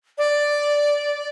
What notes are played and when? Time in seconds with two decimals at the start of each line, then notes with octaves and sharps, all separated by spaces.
0.18 D5